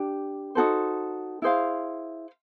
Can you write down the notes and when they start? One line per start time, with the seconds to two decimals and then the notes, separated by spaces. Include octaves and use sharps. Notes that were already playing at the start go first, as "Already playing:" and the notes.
Already playing: D4 G4
0.55 D#4 F#4 A4 C5
1.42 E4 G#4 C5 F5